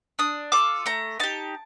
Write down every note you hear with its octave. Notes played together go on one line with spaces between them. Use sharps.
D4 D#6
F4 A4 D6
A3 A#5
D#4 G4 A5